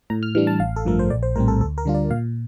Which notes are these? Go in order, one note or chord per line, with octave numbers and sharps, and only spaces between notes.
A2 A#5
F6
E3 G3 D4 F6
A5
A1 F5
A4
G2 F3 A3 A#4
C5
A#1 D5
C5
A2 G3 C4 A#4
A4
D2 A4
A#4
D3 G3 D4 F4
D5
A#2 F5